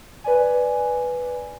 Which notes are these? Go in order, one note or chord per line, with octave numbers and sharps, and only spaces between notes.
B4 D5 G#5